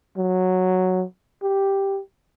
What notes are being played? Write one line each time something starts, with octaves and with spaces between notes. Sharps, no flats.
F#3
G4